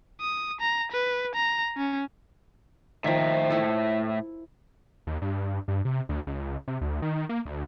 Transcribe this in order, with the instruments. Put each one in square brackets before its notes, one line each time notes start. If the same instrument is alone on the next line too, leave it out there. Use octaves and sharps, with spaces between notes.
[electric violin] D#6
A#5
B4
A#5
C#4
[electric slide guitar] A2 E5 G5 [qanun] D#3 F3
[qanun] E4 A4
[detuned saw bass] D#2
G2
G2
C3
D2
C#2
C3
D2
D#3
A#3
D2